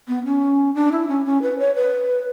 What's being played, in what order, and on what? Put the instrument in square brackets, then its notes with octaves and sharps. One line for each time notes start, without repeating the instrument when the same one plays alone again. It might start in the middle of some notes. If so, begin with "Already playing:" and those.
[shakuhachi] B3
C#4
D4
E4
C#4
C#4
B4
C#5
B4